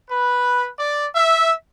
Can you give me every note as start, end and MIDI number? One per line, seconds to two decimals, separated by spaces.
0.10 0.68 71
0.79 1.06 74
1.15 1.52 76